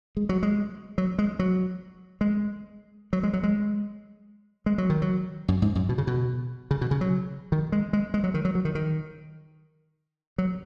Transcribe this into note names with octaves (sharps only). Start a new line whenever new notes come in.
G#3
F#3
G#3
F#3
G#3
F#3
G#3
F#3
G#3
F#3
G#3
G#3
F#3
D#3
F#3
F#2
G#2
F#2
B2
C#3
B2
C#3
B2
C#3
F#3
D#3
G#3
G#3
G#3
F#3
D#3
F#3
F#3
D#3
D#3
F#3